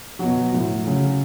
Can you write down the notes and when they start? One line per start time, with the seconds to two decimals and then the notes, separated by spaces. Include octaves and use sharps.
0.19 B2 F#3 F#4
0.52 A2 F#3
0.84 C#3 F#3